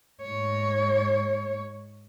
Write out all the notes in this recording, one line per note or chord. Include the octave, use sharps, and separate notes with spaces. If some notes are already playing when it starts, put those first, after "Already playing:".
G#2 C#5